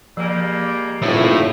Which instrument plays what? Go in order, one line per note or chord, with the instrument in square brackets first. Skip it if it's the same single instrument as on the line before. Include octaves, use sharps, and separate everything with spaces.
[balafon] F3 [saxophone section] G3 G#3 A#3
[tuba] D#1 [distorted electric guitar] A2 [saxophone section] A#3 C4 E4